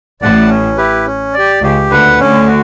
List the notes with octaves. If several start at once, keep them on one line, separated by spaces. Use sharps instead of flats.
A1 A2 D5 F#5 A5
C#4
E4 G4 B4
C#4
G4 D5
C#2 C#3 G4
D2 D3 B4 F#5
D2 D3 C#4
F#4